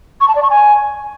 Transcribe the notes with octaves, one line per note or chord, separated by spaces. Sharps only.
C#6
A5
D5
C#6
G#5